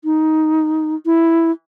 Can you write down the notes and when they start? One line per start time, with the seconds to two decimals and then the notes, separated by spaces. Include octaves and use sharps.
0.04 D#4
1.06 E4